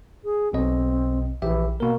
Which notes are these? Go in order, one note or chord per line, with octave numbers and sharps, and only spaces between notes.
G#4
B1 B2 C4 D#5
A#1 E3 G4 E5
B2 A#3 A#4